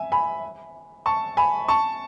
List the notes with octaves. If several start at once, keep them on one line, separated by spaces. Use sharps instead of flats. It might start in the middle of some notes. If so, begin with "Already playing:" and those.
Already playing: E5 G#5
G#5 B5
A5 C#6
G#5 B5
A5 C#6